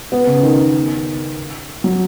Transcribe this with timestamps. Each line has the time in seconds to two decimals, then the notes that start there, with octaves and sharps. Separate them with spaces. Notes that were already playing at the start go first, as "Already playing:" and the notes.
0.12 B3
0.27 C#3
0.43 D#3
1.84 F#3